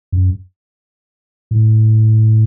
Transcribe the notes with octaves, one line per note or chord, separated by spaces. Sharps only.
F#2
A2